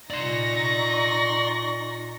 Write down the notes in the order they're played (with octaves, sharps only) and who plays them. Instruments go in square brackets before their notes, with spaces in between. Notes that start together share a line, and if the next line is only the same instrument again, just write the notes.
[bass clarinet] A#2 [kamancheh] D#4 C#6 [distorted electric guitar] D5 C6 [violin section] A#6